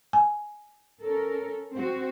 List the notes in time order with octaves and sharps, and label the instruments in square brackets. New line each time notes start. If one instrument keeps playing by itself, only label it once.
[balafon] G#5
[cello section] C#4 A4 A#4
C4 F#4